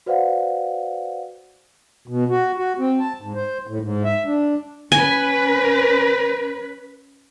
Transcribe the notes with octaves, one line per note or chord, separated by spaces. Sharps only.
F#4 B4 C5 D5 F5 F#5
B2
F#4
F#4
C4
A5
G#2
C5
A2
G#2
E5
D4
C#4 B4 G#5